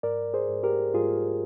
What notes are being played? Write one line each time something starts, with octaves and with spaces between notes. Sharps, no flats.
G#2 A#4 D5
G#4 C5
G#2
G4 A#4
G#2 F4 G#4